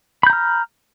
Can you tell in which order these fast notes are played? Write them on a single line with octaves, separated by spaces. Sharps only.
B5 G6 A#5 F6